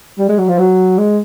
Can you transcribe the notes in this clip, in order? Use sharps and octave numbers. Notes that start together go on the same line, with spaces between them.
G3
G#3
F#3
F3
F#3
G#3